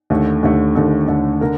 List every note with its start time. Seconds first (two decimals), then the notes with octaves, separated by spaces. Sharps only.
0.10 D#2 D3 A3
0.43 D#2 D3 A3
0.75 D#2 D3 A3 A4
1.08 D#2 D3 A3
1.41 D3 A#4